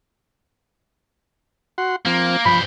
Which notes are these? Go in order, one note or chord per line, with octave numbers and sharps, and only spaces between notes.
F#4 F#5 C6
F3 A#3 C4
G2 F3 C5 B5